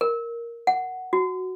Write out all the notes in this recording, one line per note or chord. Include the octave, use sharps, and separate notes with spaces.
A#4
F#5
F#4